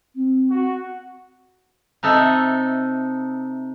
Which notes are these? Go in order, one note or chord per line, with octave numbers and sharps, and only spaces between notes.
C4
F#4
C3 D#4 A4 E5